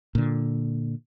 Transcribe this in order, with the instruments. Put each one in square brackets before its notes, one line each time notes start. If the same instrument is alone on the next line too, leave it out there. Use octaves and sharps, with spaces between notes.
[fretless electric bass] A#2 D3